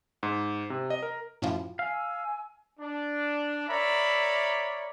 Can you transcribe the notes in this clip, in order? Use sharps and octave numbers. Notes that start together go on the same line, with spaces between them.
G#2
C3
D#5
A#4
F#2 A2 F3
F5 G#5 E6
D4
A#4 C#5 D5 E5 A#5 B5